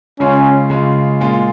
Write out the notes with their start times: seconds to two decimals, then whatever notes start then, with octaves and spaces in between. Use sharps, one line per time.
0.20 C#3 G#3 C#4 F4
0.70 C#3 G#3 F4
1.20 A#2 G#3 F4